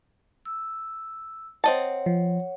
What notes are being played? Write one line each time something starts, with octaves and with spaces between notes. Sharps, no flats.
E6
C4 C#5 D#5 F#5 A5
F3